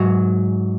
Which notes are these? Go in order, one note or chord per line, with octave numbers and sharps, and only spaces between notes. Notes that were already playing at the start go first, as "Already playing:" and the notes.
Already playing: G#2 F#3